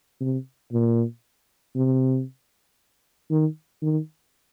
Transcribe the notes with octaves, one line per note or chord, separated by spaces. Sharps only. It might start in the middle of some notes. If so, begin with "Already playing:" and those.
C3
A#2
C3
D#3
D#3